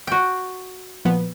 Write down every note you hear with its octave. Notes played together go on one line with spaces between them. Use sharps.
F#4 G5
A#2 F3 B3